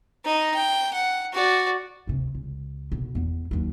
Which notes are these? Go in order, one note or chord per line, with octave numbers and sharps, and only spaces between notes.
D#4 D#5
G5
F#5
F#4 D5
D2 C3
C#2
F1 B2
E2 B3
D#2 F#3